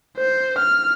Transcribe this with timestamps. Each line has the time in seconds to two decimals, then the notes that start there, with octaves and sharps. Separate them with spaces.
0.18 C5
0.59 F6